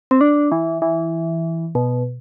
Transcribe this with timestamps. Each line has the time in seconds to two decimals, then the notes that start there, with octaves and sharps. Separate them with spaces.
0.11 C4
0.21 D4
0.52 E3
0.82 E3
1.75 B2